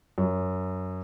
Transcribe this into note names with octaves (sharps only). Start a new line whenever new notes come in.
F#2